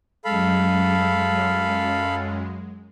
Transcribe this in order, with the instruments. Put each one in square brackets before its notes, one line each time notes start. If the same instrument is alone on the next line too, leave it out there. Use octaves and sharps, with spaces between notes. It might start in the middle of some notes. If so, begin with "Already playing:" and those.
[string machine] F#2 G#3 [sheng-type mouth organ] A4 F5 B5